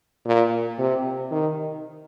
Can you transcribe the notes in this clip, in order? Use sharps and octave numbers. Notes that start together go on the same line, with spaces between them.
A#2
C3
D#3